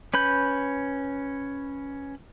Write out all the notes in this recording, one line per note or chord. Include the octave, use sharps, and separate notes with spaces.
C#4 B4 B5 G6